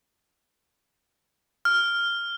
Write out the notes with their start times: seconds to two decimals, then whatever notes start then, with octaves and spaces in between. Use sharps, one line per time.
1.65 F6